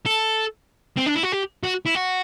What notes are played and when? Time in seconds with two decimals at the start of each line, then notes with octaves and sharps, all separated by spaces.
0.06 A4
0.97 C4
1.06 D4
1.15 E4
1.23 F#4
1.32 G4
1.64 F#4
1.86 E4
1.95 F#4